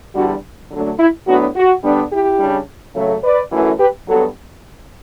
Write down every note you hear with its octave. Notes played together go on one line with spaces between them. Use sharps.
E2 D3 G3 D4 F#4
D3 F#3 A3 D4
E4
A2 F#3 B3 D4 F#4
F#4
D3 G3 B3 D4
E4 G4
C#3 G3 D4
C#3 F#3 A3
B4 D5
F#2 E3 A3
G4 B4
G2 F#3 B3 F#4 A4